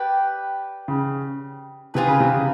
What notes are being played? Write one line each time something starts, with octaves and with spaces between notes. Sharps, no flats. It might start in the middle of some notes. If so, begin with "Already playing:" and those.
Already playing: G4 B4 D5 G5
C#3
C3 F4 G#4 B4
C#3
C3
C#3